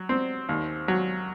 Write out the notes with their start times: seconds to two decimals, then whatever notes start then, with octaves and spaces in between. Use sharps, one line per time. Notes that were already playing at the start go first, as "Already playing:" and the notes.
Already playing: F#3
0.09 C4
0.49 D#2
0.88 F#3